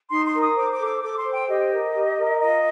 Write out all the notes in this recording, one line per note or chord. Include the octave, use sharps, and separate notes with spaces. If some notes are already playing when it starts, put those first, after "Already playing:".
D#4 C6
C6
A#4
D#6
C5 D6
D6
A4
D6
A4 D6
C6
C5
G5
G4 D#5
A#4
G4
A#4
F4 D#5